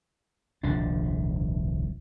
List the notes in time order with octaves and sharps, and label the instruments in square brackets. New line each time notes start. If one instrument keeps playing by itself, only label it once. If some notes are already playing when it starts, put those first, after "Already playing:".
[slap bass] D#1 C2 F3 D4